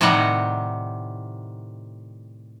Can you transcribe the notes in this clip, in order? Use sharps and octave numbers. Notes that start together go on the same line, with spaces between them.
A2 C3 D#3 G3 F#5 A#5